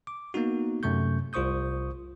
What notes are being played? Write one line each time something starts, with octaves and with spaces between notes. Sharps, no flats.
D6
A#3 B3 D#4 F#4
F#2 C3 A3 C#6 G6
C2 F4 C5 C#6 D#6 G6